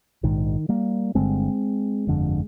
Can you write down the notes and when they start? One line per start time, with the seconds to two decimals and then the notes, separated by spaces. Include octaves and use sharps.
0.23 A#1 G#2 D#3
0.69 G3 A#3
1.15 G1 G2 D3 G#3 C4
2.07 G1 F2 D3